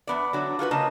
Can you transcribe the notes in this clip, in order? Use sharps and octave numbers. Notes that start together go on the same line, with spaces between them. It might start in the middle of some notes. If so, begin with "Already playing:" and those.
E2 B3 D5
D3 F#3
F4 F#4 G#4 B4
C#3 A#3 D#5 A5